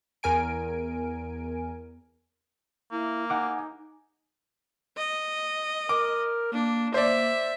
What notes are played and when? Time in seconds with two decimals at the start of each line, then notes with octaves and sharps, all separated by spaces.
0.23 E2 A#4 G#5 D7
2.92 A#3 E4
3.30 D#4 F#5 G#5 D6
4.97 D#5
5.89 A#4 D6
6.53 A#3 D4
6.94 A#3 C5 D5 E5